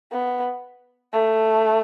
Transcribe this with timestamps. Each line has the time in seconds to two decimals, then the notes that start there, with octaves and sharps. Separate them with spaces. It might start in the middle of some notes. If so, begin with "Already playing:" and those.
0.12 B3
1.13 A3